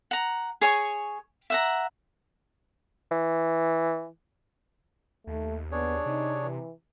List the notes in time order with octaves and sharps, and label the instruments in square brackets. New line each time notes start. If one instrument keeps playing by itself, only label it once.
[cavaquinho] F#5 A#5
G#4 C#5 G#5 C#6
E5 F#5 A#5
[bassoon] E3
[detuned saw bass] D#2 [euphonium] A3
[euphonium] B3 [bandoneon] D4 G#4 C#5
[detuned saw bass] C3 [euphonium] D#4
[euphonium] E3